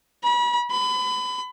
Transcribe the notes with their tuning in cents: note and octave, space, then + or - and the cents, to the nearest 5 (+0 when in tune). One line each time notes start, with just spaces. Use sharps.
B5 -35
B5 +30